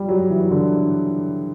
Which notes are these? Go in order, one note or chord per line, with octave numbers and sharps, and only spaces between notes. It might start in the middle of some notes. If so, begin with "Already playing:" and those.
Already playing: G3
F#3
E3
D3